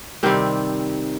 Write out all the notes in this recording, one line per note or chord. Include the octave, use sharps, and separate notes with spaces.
C3 D#3 G3 C4